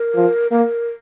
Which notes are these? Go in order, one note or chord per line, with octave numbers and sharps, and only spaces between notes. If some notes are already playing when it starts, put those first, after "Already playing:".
Already playing: A#4
F3
A#3 A#4